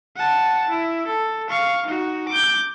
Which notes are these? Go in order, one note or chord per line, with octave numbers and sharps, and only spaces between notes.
F#5 A5
E4
A4
F5 C#6
D#4 F#4
D6 G6